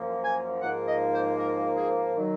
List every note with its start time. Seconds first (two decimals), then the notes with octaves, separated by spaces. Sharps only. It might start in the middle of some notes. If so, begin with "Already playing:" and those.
Already playing: F#2 F3 A#3
0.24 G#5
0.62 G#2 F3 A#3 F#5
0.87 D#5
1.14 C5
1.39 A#4
1.77 G#4
2.15 D#3 F#3